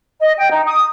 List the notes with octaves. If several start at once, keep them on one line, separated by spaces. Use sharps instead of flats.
D#5
G5
D#4
D#6